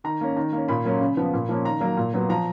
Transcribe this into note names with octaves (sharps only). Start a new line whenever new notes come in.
D#3 A#5
A#3 C#4
D#3 A#5
A#3 C#4
A#2 B5
F#3 A#3 C#4
C#3
F3 B3
A#2
F3 A#3 C#4
D#3 A#5
F#3 A#3
A#2
F#3 B3
F3 A#5